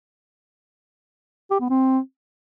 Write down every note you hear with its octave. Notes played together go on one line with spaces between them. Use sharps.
G4
B3
C4